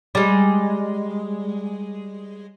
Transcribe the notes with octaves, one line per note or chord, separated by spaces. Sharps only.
G3 G#3